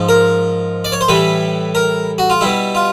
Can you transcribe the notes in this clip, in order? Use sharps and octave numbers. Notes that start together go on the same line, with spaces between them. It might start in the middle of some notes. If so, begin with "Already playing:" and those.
Already playing: G#2 F3
A#4
D5
C#5
C5
A2 E3 G3 B4
A#4
F#4
F4
B2 G3 E4
F4